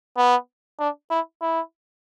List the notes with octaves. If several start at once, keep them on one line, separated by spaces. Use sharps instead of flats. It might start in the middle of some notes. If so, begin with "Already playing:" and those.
B3
D4
E4
E4